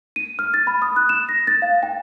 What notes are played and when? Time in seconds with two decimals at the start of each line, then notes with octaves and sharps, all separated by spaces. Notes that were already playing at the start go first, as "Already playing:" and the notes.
0.16 D#7
0.39 F6
0.54 A6
0.67 B5
0.82 D#6
0.96 F#6
1.09 E7
1.29 A#6
1.47 A6
1.62 F5
1.83 G5